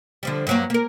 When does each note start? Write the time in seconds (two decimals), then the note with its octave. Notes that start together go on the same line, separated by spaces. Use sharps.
0.23 D3 F3 G3
0.47 G2 F#3 A#3
0.70 A#3 A#4